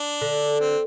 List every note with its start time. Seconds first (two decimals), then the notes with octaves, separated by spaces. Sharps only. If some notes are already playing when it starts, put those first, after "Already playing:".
Already playing: D4
0.22 D3
0.60 C4